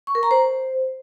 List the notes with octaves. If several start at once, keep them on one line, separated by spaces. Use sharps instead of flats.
C#6
A#4
A#5
C5